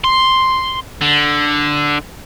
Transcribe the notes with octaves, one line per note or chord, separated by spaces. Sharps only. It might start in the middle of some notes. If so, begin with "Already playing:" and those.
C6
D3